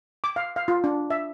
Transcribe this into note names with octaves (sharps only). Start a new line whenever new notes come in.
D6
F5
F5
F4
D4
E5